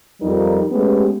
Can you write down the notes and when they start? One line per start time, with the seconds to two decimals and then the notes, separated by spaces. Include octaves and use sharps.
0.22 F2 F3 G3 D#4 G4 A#4
0.71 G#3 A3 B3 C#4 G4